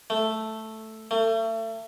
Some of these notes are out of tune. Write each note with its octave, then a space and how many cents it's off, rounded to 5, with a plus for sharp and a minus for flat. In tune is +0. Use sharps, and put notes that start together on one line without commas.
A3 +0
A3 +35